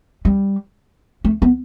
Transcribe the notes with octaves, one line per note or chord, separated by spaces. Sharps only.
G3
A3
B3